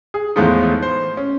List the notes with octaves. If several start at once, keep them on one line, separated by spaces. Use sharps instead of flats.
G#4
E2 A2 F3 G#3 B3 D#4
C5
C#4